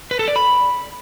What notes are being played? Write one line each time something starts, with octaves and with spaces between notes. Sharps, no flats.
B4
A4
D5
B5